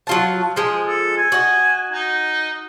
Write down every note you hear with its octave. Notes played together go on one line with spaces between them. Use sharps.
F#3 F4 A5
F3 G#3 D#6
A4
G#5
F#4 D#5
D#4